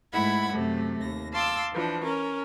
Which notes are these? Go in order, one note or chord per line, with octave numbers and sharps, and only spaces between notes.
G#2 A3 E4 F#5 B5 G#6
F#2 C3 A3
D#2 A#6
F5 A5 C6 D6 E6
E3 F3 D4
C#4 A#4